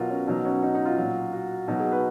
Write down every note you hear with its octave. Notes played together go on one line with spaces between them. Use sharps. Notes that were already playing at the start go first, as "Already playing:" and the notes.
Already playing: B2 F#3 F4 A#4
C#4
B2 F#3 D#4
C#4
D#4
D#4
F4
A#2 F#3
F#4
B2 F#3 D#4
G#4
B4